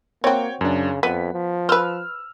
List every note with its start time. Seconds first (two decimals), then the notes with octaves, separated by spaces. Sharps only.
0.24 A#3 C4 F#4 C#5 G5
0.61 F#2 C#3 D4
1.03 F2 B3 B6
1.33 F3
1.69 B4 C5 E6 F6